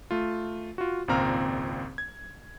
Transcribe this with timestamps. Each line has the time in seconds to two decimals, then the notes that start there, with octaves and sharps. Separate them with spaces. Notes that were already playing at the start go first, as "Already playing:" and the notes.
0.11 A3 F4
0.78 F4 F#4
1.08 G#1 C#2 A#2 C4 A#5 F6
1.98 G#6